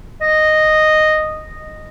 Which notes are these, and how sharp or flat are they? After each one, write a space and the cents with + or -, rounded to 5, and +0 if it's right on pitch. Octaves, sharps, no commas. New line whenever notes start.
D#5 -10